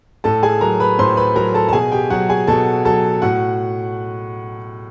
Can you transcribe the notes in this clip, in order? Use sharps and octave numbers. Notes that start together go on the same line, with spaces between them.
A2 A4 A5
G#4 G#5
F#3 A#4 A#5
B4 B5
A2 C5 C6
B4 B5
F#3 A#4 A#5
A4 A5
A5
B2 G#4 G#5
G4 G5
F#3 F#4 F#5
G#4 G#5
B2 A4 A5
F#3 A4 A5
A2 F#4 F#5